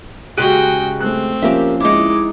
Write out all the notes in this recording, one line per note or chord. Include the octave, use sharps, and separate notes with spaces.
C#3 G#3 F#4 G4 G5 F#6 D7 D#7
A3 C4 F#6
F3 A#3 C#4 G4 A#4 E5
G#3 D#4 E4 D6